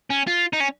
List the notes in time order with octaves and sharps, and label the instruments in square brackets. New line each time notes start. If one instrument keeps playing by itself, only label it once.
[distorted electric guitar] C#4
F4
D#4
C#4